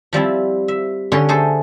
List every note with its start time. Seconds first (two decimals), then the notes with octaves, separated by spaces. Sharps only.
0.13 F3 G3 C4 E4
0.68 E5
1.12 D3 C#4 G4 C#5 C6
1.29 A3 G#4 A4 C5